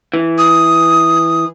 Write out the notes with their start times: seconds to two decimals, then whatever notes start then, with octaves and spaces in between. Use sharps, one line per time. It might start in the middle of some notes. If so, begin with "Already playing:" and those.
0.14 E3
0.38 D#6